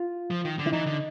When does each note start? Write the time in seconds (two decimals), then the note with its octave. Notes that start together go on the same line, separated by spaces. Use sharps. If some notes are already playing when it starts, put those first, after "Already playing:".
Already playing: F4
0.30 F3
0.45 D#3
0.59 D3
0.67 E4
0.73 E3 D#4
0.86 D3